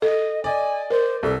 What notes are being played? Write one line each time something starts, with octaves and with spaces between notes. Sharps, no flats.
A4 D#5
D5 D#5 G#5
A#4 C5
C2 A4